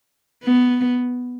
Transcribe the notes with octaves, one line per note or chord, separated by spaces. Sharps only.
B3